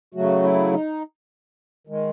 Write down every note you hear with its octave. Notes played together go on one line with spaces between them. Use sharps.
C#3 F#3 A3 F#4
E4
D#4
D#3 G#3